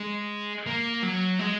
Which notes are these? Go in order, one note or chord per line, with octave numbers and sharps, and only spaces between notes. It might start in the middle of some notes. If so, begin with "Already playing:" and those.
Already playing: G#3
A#3
F#3
G#3